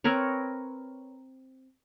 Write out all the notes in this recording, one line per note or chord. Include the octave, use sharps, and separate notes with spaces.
C4 A#4 B4 C#5